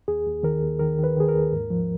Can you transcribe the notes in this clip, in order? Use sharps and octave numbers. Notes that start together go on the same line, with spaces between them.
D#2 G#4
D#2
D#3 A#4
D#2
D#3 A#4
D#3 B4
D#3 G#4
A#4
D#2
G#2
F3